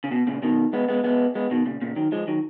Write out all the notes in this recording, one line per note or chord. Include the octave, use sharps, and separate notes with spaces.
C#3
B2
A#2 C#3
B2 D#3
G#3 B3
G#3 B3
G#3 B3
G#3 B3
B2 D#3
A#2 C#3
A#2 C#3
D#3 F#3
F3 G#3
D#3 F#3